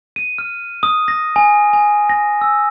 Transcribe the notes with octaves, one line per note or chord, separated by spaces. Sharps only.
D#7
F6
D#6
A#6
G#5
G#5
A#6
E6